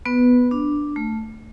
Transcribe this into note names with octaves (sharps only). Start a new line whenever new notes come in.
B3 B4
D4
A3